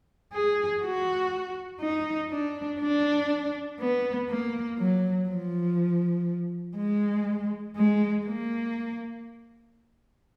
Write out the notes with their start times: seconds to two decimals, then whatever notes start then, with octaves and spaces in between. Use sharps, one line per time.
0.33 G#4
0.83 F#4
1.82 D#4
2.32 D4
2.81 D4
3.80 B3
4.30 A#3
4.79 F#3
5.29 F3
6.77 G#3
7.76 G#3
8.26 A#3